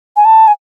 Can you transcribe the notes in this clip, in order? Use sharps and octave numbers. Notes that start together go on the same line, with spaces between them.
G#5
A5
G#5